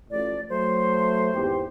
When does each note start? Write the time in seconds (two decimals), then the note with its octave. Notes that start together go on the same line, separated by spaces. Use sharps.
0.11 A1 A2 F3 D5
0.49 F#3 A3 C5
1.33 G#1 E2 G4